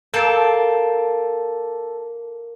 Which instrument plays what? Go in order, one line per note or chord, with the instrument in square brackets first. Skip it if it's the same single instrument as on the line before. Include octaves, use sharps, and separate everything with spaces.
[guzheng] A#3 G5 A5 [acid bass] A4